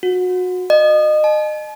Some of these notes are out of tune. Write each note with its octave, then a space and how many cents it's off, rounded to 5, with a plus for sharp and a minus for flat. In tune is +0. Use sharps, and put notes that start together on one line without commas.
F#4 -25
D#5 -30
A5 -45